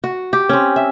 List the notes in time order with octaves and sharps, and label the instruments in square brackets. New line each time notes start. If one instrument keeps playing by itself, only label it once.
[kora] F#4
G4
C4 C#4
E5